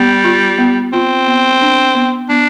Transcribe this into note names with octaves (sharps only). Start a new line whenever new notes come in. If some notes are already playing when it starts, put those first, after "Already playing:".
Already playing: G3 B3
F4
B3
C4 F4
B3
D4
B3
B3 D4